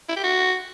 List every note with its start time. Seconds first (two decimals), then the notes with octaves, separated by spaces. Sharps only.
0.09 E4
0.16 G4
0.24 F#4